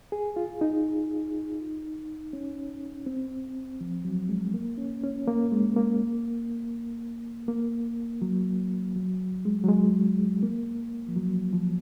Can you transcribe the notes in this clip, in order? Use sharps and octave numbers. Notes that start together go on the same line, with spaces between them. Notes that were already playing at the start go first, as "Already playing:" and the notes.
G#4
F4
D#4
C#4
C4
F3
F#3
G#3
A#3
C#4
C#4
A#3
G#3
A#3
A#3
F#3
F#3
G#3
F#3
G#3
A#3
F3
F#3
F3